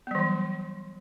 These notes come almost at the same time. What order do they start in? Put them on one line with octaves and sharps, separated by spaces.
B3 G3 E3 F#3